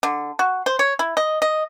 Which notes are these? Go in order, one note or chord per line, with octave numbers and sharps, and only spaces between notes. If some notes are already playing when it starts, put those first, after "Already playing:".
D3
F#4
C5
C#5
E4
D#5
D#5